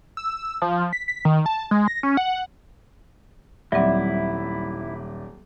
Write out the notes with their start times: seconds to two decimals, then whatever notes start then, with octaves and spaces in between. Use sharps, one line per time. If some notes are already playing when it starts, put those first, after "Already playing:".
0.17 E6
0.62 F3
0.93 B6
1.08 B6
1.25 D#3
1.46 A5
1.71 G#3
1.88 A#6
2.03 C#4
2.17 F#5
3.72 D#1 F#3 G3 C4 E4 D5 E5 F#5